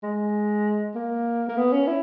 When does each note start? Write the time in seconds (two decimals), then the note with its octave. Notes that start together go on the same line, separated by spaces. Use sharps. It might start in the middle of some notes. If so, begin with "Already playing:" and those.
0.03 G#3
0.95 A#3
1.49 A#3
1.57 B3
1.72 C#4
1.87 E4